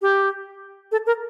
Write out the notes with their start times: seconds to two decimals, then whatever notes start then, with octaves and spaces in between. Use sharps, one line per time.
0.02 G4
0.92 A4
1.06 A#4